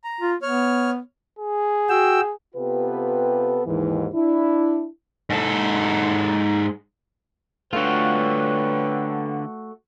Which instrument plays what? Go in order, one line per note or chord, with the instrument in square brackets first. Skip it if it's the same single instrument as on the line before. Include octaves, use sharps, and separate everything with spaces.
[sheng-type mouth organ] A#5
[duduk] F4
[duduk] B3 [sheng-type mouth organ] C#5 F6
[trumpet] G#4
[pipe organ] F#4 G5 E6
[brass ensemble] C3 B3 F4 G4 A4 B4
D#2 G#2 E3
D4 E4
[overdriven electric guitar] G#2 A4
[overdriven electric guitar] D3 F4 [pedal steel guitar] A3 F#4 [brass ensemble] B4 C#5 G5